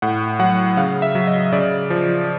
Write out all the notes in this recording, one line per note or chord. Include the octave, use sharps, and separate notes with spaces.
A2 F#5
F#3 F#5
C#3 F5
E5
F#3
D#5
C#3 D5
F3